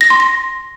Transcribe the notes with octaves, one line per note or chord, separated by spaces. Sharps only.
A#6
C6
A#6